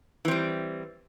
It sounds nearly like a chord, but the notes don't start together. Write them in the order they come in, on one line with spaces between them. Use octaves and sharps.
E3 C4 G3